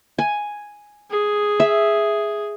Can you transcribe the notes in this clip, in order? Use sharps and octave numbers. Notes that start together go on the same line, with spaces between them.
G#5
G#4
E5